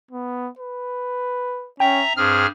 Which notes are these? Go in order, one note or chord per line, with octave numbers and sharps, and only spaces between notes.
B3
B4
C#4 E5 G5 A#5
G2 C4 G#4 F6